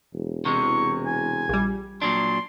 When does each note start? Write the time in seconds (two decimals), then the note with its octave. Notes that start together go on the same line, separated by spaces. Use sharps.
0.13 E1
0.45 C3 E3 G#3 C#6
1.06 G#5
1.49 A#1 G3
2.02 A#2 F#3 D4 C6